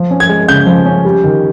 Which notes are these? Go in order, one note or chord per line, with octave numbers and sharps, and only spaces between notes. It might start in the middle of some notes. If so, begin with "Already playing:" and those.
Already playing: F3
C#4
G#6
G#3
C#3 G6
F3
C#4
G3
D#3